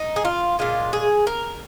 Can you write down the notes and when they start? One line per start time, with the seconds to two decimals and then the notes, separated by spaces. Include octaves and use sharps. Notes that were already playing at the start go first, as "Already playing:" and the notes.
Already playing: D#4
0.16 G#4
0.25 F4
0.59 A#2 G#3 F4
0.93 G#4
1.27 A#4